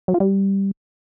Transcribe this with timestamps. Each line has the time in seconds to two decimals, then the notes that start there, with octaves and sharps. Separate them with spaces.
0.08 F#3
0.14 F4
0.20 G3